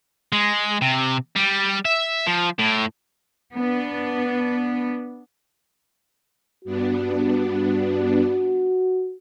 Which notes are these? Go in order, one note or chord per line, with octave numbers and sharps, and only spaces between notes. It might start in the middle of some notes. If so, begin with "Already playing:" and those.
G#3
C3
G3
E5
F3
A2
B3 D4
G2 B3 D4 F#4